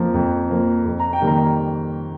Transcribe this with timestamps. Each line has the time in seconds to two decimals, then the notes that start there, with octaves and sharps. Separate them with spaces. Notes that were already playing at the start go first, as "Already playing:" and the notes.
Already playing: F2 F3 A#3
0.14 F2
0.50 F3 A#3
0.85 F2
1.00 A#5
1.13 G5
1.21 D#3 G3 A#3
1.27 A#5